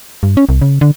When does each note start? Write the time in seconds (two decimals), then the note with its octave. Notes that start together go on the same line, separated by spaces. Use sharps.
0.23 G2
0.37 C#4
0.49 C2
0.62 C#3
0.81 D3